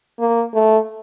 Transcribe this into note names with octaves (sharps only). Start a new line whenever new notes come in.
A#3
A3